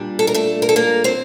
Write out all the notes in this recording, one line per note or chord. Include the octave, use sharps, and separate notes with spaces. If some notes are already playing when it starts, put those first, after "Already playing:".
Already playing: A#2 G3 D4
A4
A#4
A3 A4
A#4
A4
A#3 A#4
C4 C5